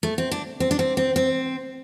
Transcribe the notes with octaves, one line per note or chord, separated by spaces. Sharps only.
A3
C4
D4
C4
D4
C4
C4
C4